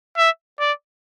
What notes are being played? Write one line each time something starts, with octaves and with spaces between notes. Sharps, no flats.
E5
D5